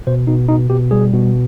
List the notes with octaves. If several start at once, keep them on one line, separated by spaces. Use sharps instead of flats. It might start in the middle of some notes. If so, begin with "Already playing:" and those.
B2 C5
B2 D#4
B2 D#4
B2 G4
G3 G#4
B2